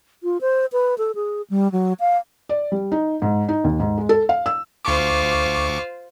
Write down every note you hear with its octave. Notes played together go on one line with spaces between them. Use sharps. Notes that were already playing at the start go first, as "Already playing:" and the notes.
F4
C5
B4
A4
G#4
G3
F#3
F5
D5
G3
D#4
G#2
D#4
D#2
G#2
G#3
A4
F5
E6
D2 F4 C5 C#6 D6